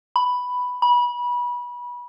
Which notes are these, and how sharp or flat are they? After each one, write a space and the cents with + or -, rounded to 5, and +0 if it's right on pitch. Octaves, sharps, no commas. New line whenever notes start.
B5 +5
B5 -25